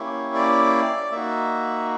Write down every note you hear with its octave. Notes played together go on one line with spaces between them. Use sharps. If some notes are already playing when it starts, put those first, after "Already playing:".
Already playing: A#3 C#4 E4 G4 C#5
D5
A#3 D#4 F#4 E5